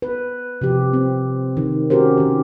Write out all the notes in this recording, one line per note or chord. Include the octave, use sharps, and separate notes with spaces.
B4
C3 F3 G4
C4
D#3
C#4 F#4 G4 A#4 C5
D#3 G4